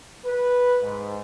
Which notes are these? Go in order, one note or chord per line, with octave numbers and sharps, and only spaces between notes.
B4
G#2